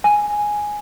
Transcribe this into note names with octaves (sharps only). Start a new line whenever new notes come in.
G#5